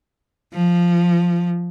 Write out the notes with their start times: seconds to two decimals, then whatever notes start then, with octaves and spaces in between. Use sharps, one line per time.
0.53 F3